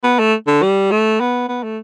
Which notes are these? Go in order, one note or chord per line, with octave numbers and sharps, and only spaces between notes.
B3
A3
D3
G3
A3
B3
B3
A3